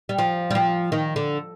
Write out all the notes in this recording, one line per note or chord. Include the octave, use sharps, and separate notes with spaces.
G3
F3
G3
F3
D#3
D3